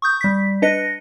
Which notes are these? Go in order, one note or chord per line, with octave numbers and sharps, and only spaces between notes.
C#6 D#6 G6
G3 B6
D4 B4 D#5 A#6 C#7